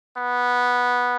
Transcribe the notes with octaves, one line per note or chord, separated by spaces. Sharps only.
B3